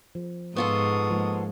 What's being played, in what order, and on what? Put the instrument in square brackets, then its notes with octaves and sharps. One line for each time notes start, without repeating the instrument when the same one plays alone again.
[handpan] F3
[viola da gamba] G#2 [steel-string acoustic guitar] B3 F4 A4 [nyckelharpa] C#6 D#6
[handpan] F3 G#3 A#3